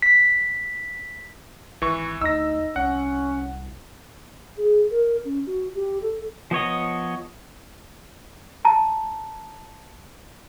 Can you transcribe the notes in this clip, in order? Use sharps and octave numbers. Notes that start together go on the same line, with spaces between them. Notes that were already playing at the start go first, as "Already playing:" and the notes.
B6
G#1 E3 C#6
D2 D#4 E6 A#6
C2 C#4 F#5
G#4
A#4
C#4
F#4
G4
A4
F3 B3 C#5 D#5
A5 A#5